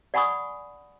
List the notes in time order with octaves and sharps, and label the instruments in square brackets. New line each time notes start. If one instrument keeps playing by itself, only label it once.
[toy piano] D5 F#5 G#5 B5 C#6 D#6